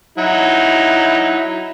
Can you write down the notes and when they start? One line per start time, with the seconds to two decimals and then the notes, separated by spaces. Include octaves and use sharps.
0.18 F#3 D#4 E4